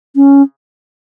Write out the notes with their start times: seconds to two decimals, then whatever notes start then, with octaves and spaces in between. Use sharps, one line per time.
0.16 C#4